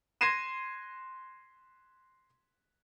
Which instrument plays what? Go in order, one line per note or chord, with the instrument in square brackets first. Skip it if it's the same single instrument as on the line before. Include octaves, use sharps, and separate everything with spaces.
[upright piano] C6 G#6 A#6 C7 D#7 E7